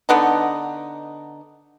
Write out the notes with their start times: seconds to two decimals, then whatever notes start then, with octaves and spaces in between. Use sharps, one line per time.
0.09 D3 B3 D#4